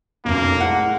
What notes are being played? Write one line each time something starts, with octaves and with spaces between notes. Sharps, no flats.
F1 B1 F#2 A#3
A2 G#3 F#5